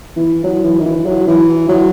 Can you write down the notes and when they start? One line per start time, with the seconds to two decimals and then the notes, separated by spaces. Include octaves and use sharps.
0.16 E3
0.43 F#3
0.64 E3
0.80 D#3
0.86 E3
1.06 F#3
1.27 E3
1.69 F#3